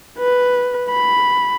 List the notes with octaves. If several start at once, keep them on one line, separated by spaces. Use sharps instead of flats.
B4
B5